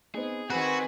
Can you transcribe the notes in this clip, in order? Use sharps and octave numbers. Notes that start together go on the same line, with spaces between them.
B3 C4 D#4 G#4
D#3 C4 F#4 G#4 B4 B5